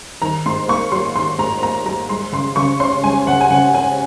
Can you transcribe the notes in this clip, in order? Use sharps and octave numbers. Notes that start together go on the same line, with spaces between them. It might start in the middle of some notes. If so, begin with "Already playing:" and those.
D#3 A#5
G#2 C6
A#3 C#6
F#3 C6
D#3 C6
G#2 A#5
A#3 A#5
F#3 A#5
G#3 C6
C#3 C6
C#3 C#6
C#4 C6
G#3 G#5
C#3 F#5
G#5
C#3 F#5
C#4 G#5